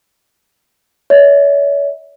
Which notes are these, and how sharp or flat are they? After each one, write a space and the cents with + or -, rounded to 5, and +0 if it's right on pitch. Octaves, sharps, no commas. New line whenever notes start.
C#5 +40 E5 -40